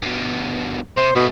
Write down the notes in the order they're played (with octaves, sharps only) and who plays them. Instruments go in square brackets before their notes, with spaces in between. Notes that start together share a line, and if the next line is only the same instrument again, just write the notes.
[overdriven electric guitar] G2 B2
[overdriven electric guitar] C3 [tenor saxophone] C5
[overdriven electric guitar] G#2 A3 [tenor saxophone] B2